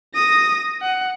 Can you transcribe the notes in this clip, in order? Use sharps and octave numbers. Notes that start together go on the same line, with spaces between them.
D#6 A#6
F#5